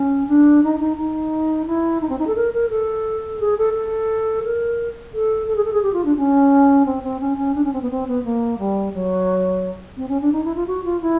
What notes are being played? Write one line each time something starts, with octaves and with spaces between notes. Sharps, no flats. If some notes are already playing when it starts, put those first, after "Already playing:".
Already playing: C#4
D4
D#4
D#4
D#4
E4
D#4
C4
D#4
A4
A#4
A#4
A4
G#4
A4
A4
A#4
A4
A4
G#4
A4
G#4
G4
F4
D4
C#4
C4
C4
C#4
C#4
D4
C#4
C4
B3
C4
B3
A#3
G3
F#3
C4
C#4
D4
D#4
E4
F4
F#4
F4
E4